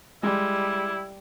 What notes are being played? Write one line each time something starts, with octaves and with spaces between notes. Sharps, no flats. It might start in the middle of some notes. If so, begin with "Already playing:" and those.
G3 G#3 E4